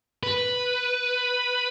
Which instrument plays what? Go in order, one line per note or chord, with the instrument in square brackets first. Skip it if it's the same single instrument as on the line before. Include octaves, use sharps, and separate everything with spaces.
[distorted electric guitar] B4